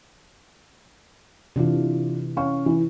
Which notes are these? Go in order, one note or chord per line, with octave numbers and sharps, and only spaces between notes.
C3 E3 D4 F4
C#4 F5 C#6
E3